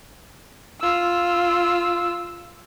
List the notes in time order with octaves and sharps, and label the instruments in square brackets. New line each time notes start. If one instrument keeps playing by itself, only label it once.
[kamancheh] F4 E6